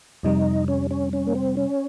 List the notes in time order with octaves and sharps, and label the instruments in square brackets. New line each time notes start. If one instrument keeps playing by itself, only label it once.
[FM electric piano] F2 C3 G3 [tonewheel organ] D#4
[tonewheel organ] C#4
C#4
C#4
A#3
C4
C#4